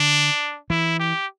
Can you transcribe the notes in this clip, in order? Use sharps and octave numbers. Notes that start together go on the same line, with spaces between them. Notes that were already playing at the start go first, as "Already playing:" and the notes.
Already playing: D3 D4
E3 E4
G4